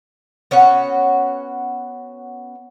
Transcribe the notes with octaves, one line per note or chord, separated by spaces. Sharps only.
B3 C#4 F#4 F#5